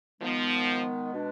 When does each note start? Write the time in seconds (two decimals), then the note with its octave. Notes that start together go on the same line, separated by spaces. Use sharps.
0.21 D#3 F3 G#3 B3
1.12 B2 G#3 D4